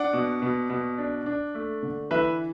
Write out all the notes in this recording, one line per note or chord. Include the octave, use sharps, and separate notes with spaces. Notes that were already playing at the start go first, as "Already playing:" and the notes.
Already playing: D4 D5 F#5
B2
B2
B2
D4
D4
A3
D3
E3 B4 E5